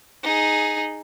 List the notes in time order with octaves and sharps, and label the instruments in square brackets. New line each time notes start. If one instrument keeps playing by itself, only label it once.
[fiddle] D#4 G#4